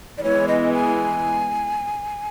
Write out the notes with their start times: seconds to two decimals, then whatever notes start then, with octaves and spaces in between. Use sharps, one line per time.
0.18 D5
0.23 E3 G#3 B3 C#5
0.48 D#5
0.73 G#5